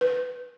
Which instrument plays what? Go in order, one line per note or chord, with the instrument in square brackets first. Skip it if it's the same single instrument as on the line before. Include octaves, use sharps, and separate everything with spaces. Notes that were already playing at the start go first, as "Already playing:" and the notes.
[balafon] B4